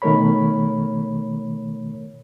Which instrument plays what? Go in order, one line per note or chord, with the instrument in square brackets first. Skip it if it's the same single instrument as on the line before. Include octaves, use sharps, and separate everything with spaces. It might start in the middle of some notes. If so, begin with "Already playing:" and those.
[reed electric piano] B2 D#3 A3 A#4 C#5 B5